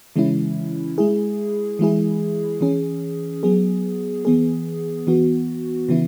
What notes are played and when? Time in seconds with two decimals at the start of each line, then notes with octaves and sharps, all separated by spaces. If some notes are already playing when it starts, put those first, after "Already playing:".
0.16 C#3 E3 G#3 C#4 E4
0.98 G#3 E4 G#4
1.79 E3 G#3 E4 G#4
2.61 E3 C#4 G#4
3.43 F#3 B3 G#4
4.25 E3 B3 G#4
5.07 E3 B3 F#4
5.89 C#3 E3 B3 E4